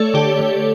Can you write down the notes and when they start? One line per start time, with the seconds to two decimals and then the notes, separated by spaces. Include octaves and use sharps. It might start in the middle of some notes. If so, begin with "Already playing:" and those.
Already playing: A3 A4 C#5 D5
0.14 D3 G4
0.39 D3